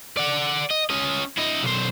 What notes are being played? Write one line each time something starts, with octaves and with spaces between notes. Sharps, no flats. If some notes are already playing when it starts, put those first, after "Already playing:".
D5 F#5
D#5
C#4 D#5
E4 D#5
B1 C5